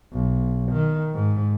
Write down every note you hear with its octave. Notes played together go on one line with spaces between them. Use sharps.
B1
D#3
G#2